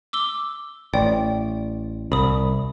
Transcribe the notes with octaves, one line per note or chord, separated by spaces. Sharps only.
D6 E6 G7
A1 D5 G5
C2 B5 D#6